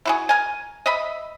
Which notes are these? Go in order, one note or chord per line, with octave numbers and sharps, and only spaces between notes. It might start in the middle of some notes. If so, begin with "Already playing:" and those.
E4 F#4 G#4
A#4 G#5
D#5 E5 B5